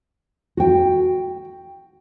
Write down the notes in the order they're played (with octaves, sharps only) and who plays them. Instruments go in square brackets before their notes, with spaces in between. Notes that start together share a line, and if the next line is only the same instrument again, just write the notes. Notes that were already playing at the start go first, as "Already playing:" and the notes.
[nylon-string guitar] F#4 G5